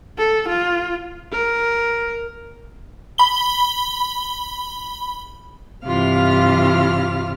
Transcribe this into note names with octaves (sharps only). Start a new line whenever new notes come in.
A4
F4
A#4
B5 G7
G2 C3 E3 F4 F5 F6